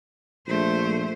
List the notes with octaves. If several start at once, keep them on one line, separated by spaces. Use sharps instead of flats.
A#1 A3 C5